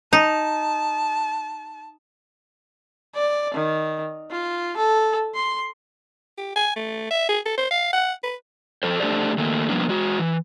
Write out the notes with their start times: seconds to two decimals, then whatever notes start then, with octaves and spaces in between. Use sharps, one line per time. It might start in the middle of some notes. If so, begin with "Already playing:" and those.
0.13 D#4 A5
3.15 D5
3.54 D#3
4.31 F4
4.77 A4
5.35 C6
6.37 G4
6.56 G#5
6.76 A3
7.10 E5
7.29 G#4
7.45 A4
7.57 C5
7.71 F5
7.93 F#5
8.23 B4
8.83 F3 A4 C5
9.00 A3 D4 G4 A4 C5 D5
9.38 D#3 A3 A#3
9.69 F3 G3 A#3 B3 D4
9.89 G#3 F#4
10.19 E3